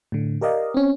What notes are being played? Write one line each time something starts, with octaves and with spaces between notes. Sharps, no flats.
A2 D3
G4 A#4 D5 D#5 F5
C4 C#4